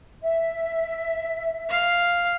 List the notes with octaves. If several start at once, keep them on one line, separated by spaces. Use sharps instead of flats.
E5
F5